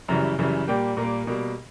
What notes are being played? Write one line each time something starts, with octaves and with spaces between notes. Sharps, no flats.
F#2 C#3 E3 G3 A#5
F#2 C#3 E3 G3
A#2 G3 A#3 G5
A#2 G3 A#3 A#4
B2 G3 A#3